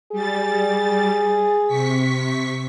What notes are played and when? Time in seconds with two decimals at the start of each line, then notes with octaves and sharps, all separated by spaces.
0.12 G3 G#4 A6
1.67 C3 C#6 B6